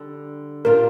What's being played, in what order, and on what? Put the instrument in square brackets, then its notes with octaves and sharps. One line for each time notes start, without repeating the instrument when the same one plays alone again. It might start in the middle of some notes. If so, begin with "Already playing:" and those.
Already playing: [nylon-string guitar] D3 G3 D4
[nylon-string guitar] A#2 G3 D4 F4 [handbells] A#4